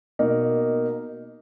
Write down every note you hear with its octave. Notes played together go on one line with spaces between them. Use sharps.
B2 A#3 D#4 A#4